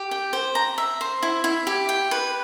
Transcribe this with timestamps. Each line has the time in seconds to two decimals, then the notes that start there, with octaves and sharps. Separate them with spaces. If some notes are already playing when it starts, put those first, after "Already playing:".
Already playing: G4
0.11 G5
0.33 C5
0.55 A#5
0.78 E5
1.01 C5
1.23 E4
1.44 E4
1.67 G4
1.89 G5
2.11 B4